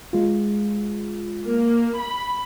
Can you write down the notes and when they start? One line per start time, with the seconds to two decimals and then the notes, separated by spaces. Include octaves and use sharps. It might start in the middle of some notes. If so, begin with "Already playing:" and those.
0.13 G#3 F4
1.44 A#3
1.99 B5